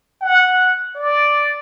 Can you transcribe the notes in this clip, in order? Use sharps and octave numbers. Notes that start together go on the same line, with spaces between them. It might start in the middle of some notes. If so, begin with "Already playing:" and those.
F#5
D5